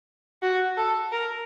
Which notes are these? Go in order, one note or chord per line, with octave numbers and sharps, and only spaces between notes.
F#4
A4
A#4